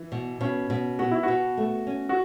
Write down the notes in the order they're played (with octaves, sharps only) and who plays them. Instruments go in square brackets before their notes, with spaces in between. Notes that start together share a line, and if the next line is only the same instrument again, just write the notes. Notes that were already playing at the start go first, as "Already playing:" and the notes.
Already playing: [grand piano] E3
[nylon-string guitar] B2
[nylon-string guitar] B2 [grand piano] C#4
[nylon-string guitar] B2
[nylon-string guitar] B3 [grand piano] F#4
[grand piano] E4
[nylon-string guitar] B2 [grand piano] F#4
[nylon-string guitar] A3
C#4
[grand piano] F#4